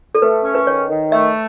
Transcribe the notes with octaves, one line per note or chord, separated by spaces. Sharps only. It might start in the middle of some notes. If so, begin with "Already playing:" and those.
A4
A3 B4
C#4
B4
D#3 C#5
D#3
A3 E5